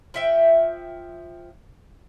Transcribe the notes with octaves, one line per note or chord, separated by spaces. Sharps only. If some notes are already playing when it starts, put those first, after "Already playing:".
F3 E5 G5